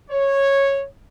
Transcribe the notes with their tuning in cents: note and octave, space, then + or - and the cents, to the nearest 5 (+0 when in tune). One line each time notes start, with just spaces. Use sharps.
C#5 -10